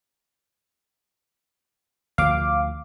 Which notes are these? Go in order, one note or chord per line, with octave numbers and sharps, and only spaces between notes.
D2 F3 F5 D6